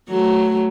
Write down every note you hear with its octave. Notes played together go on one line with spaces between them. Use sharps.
F#3 A3